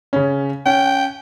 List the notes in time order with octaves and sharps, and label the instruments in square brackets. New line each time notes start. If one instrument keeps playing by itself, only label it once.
[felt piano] C#3 C#4
[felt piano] C#4 [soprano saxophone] G5